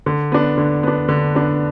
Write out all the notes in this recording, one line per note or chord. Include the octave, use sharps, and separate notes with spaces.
D3
B3 D4
D3
B3 D4
D3
B3 D4